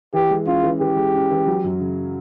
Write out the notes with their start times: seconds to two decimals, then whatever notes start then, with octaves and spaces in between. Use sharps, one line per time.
0.13 E3 G4
0.31 G#3
0.46 C#4 F4
0.64 E3
0.80 E3 G4
0.96 G#3
1.14 C#4
1.31 E3
1.46 F#3
1.64 F#2
1.80 C#3